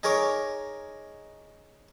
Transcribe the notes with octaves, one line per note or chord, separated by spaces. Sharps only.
D#4 G#4 A#4 C#5 D6